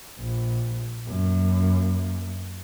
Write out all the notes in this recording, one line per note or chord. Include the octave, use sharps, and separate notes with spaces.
A#1
F#2 A#3